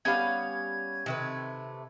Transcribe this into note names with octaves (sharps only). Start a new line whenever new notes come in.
G3 B3 C#4 F5 G5 G#6
C3 D#3 A3 B4